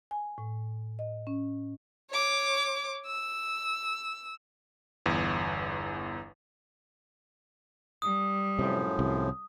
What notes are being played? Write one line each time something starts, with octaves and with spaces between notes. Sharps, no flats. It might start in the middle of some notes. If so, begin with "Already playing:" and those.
G#5
A2
D#5
C#4
C#5 D6
E6
G1 E2
G3 D#6
F#2 A2 C3 F3
C2 C3